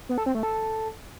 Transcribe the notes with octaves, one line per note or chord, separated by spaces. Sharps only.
B3
A4
C4
A3
A4